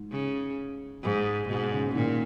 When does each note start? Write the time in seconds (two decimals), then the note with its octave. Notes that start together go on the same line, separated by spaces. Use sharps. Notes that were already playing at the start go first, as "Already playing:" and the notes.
Already playing: G#2
0.11 C#3
1.03 G#2
1.48 G#2 B2
1.72 C#3
1.94 A#2 D#3